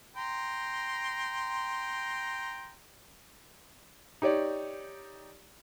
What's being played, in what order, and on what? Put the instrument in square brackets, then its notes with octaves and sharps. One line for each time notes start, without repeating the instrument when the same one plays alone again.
[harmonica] G5 A#5 C6
[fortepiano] D#4 G4 C#5 D5